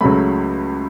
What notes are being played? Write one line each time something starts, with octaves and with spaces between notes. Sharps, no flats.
C#2 C#3 F#3 A3 B5